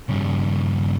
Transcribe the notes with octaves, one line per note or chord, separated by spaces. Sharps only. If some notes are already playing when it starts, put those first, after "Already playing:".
G2 C#3